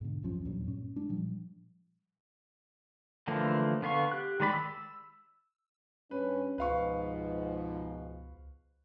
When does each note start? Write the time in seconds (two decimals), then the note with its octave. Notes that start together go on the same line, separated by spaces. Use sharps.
0.01 G#2 B2 D3
0.22 C2 F#2 F3 C#4
0.45 E2 G2 A#2 F#3
0.64 G2 A#2 C#4
0.96 G#3 D4
1.09 A#2 F3 G3
3.27 D3 E3 F3 A3 A#3
3.82 D3 B3 F5 C#6
4.12 G4 F#6
4.40 D#3 G#3 D5 B5
4.53 E6
6.11 G2 C#4 B4
6.58 C#2 G#2 B2 F3 B4 F5 C#6